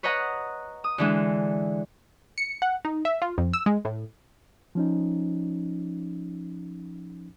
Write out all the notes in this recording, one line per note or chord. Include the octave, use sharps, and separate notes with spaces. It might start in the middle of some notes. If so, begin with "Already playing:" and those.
B4 C#5 D#5 F#5 A#5
D#6
D3 E3 G#3
C#7
F#5
D#4
E5
F4
F2
E6
G#3
A2
F3 C#4 D#4